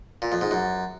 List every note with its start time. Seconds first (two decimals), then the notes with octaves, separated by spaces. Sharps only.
0.22 A#2
0.32 F2
0.41 G#2
0.51 F#2